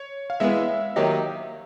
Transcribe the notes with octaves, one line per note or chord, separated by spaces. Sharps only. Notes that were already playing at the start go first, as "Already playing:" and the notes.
Already playing: C#5
F5
E3 G#3 B3 E5
D#3 F#3 A#3 D#4 G4